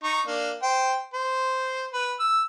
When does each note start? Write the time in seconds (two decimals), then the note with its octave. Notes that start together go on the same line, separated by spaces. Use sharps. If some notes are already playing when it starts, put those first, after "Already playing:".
0.04 D#4 C#6
0.27 A#3 D4
0.63 C5 G5
1.13 C5
1.93 B4
2.19 E6